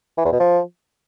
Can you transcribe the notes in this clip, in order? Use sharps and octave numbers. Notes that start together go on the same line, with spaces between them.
E3
E2
B2
F3